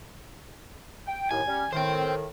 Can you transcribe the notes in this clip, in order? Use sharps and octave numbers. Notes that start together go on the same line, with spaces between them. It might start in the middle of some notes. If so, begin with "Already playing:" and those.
G5
D#2 A2 G#5
G3 C#4
A2 D#3 C5 G5